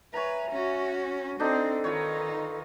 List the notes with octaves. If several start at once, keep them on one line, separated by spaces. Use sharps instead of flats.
B4 C#5 E5 G#5 A#5
C#4 F#4
C4 D4 D#4 A4
D#3 D#4 F4 B4 C#5